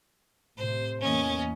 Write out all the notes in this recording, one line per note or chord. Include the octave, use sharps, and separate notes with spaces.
A2 C3 C5
E2 A#3 B3 C#4 D#5